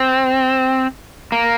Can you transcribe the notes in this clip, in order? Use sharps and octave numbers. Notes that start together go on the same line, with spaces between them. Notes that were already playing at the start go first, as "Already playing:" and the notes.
Already playing: C4
A#3